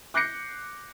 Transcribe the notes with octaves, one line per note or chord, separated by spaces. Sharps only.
D6 F#6 G6 A#6 C7 C#7